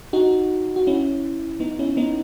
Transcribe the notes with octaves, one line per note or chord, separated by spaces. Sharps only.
D#4 F#4
F#4
C#4 E4
B3 D#4
C#4 E4
B3 D#4